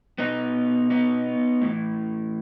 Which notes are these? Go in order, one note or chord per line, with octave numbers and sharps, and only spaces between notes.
B2 B3 D#4
B3 D#4
A2 E3